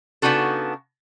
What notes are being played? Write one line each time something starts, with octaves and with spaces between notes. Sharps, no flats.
C#3 B3 D4 D#4 F#4 A4